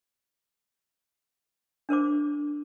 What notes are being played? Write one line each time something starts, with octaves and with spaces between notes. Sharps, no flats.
D4 A#4 C5 D6